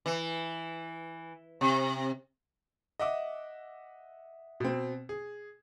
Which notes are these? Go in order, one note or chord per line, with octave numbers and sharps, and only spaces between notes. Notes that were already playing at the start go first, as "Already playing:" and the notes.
E3
C3
D#5 E5 F#5 D6
B2 C4
G#4